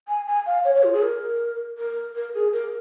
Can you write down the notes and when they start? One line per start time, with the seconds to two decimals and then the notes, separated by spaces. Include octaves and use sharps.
0.08 G#5
0.27 G#5
0.46 F5
0.65 C#5
0.75 C#5
0.84 F4
0.93 G#4
1.03 A#4
1.78 A#4
2.16 A#4
2.35 G#4
2.53 A#4